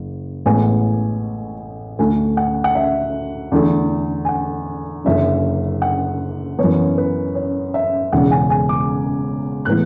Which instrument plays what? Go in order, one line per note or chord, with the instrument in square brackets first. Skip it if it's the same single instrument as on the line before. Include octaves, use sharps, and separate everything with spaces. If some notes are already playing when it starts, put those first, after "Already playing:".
Already playing: [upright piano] F#1
A1 A2 G#3 B3 G#5
D2 D3 A3 G#5
F#5
F#5
E5
E2 D3 A3
G#5
F#5
F#1 F#2 D3 E5
F#5
F#2 E3 B3 C#5
B4
C#5
E5
E1 E2 C#3 F#5
G#5
G#5
D6
A2 E3 G#3 B3 F#6